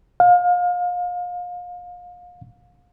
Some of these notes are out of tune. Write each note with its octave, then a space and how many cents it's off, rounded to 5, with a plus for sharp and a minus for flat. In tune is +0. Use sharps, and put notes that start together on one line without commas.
F5 +30